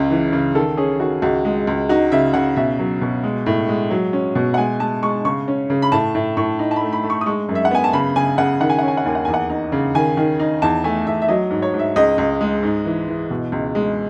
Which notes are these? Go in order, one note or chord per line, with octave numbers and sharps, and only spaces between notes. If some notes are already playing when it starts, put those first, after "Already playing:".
Already playing: C#2 C#3
E3
C#3
D#3 A4
C#4 G#4
D#3 F#4
C#2 F#4
G#3
C#2
D#4 F#4
C#3 E5
C#3 F#5
B2 E5
F#3
B2
G#3
A2
G#3
F#3
C#4
B2
F#5
G#3 G#5
G#3 A5
G#3 C#6
C#3 C#6
C#4
C#3
B5
A2 A5
A2
A2 C#6
D#4
A5
A3 B5
B5
A3
C#6
D#6
G#3 C#6
F#2
E5
F#5
B3 G#5
A5
C#3 B5
C#3 G#5
C#3 F#5
D#3 F#5
G#5
F#5
C#4 G#5
F#5
D#2 G#5
F#5
E2 G#5
F#5
D#4
C#3
D#3 G#5
D#3
D#4
E2 A5
A3 G#5
E2 E5
E5
F#3 D#5
G#2
C#5
G#2
E5
C#2 D#5
C#2
G#3
G#2
E3
E3
B2
C#2
G#3